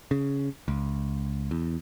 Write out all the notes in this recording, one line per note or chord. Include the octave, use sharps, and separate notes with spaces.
C#3
C#2
E2